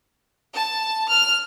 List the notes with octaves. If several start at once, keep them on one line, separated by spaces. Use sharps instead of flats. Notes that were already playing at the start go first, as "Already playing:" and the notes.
A5
F6